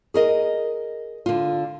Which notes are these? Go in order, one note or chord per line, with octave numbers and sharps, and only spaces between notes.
G#4 A#4 D#5
D3 F4